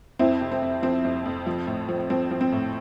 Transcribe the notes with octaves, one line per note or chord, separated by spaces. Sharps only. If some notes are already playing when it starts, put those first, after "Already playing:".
F2 C4 E4
C3
C4
F2
F3 C4
F2
F2
F3
A2
F3
F3 C4
F3
C4
A2